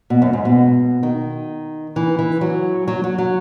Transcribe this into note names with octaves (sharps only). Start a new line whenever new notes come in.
B2
F#2
G#2
B2
D#3
E3
E3
F#3
F#3
F#3
F#3